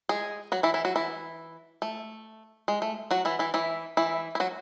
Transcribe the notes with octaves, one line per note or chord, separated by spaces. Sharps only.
G#3 G#4
F#3 F#4
E3 E4
E3 E4
F#3 F#4
E3 E4
A3
G#3
A3
F#3 F#4
E3 E4
E3 E4
E3 E4
E3 E4
E4
F#3 F#4